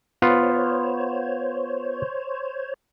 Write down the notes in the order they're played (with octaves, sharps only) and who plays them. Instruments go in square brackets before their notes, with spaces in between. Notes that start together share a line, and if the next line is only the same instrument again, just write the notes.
[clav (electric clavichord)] B3 F4 [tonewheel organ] C5 C#5